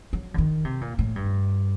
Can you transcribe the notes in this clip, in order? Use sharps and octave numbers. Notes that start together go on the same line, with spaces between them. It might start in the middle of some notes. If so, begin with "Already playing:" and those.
F#3
D3
D#3
C3
A#2
A2
G2